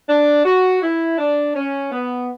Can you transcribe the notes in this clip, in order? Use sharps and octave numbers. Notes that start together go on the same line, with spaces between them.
D4
F#4
E4
D4
C#4
B3